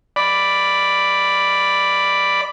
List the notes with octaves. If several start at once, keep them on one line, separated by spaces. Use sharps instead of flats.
D5 B5